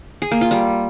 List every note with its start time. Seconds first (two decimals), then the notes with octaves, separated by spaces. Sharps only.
0.22 G#4
0.31 A#3
0.41 F4
0.51 G3